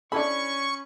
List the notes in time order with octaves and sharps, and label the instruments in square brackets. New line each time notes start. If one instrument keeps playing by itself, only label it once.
[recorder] C#4 [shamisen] D4 E4 A4 [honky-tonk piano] B5 [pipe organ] C#6